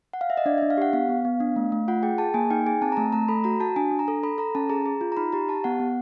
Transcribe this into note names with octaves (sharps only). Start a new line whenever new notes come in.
F#5
F5
E5
D#5
D4 D5
D4 E5
F5
G4 F#5
B3 F5
B3
B3
D4
A3
A3
F4 F#5
G#4 G5
G#4 A5
A#3 G#5
D#4 G5
G#4 G#5
C4 A5
A#5
A3 A5
A3 A#5
A4 B5
F#4 A#5
F#4 A5
D4 G#5
D4
A#5
A4
A4 B5
A4 A#5
C#4 A5
G#4 A#5
G#4
F4
A#5
D#4 B5
G4 A#5
G4 A5
B3 F#5
B3